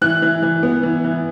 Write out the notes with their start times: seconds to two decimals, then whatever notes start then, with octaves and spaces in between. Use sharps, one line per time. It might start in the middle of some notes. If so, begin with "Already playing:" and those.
0.02 E3 F#6
0.22 E3
0.43 E3
0.63 B3
0.83 E3
1.04 E3